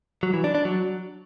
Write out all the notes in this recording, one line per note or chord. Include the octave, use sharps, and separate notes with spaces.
F#3
E3
D4
D4
F#3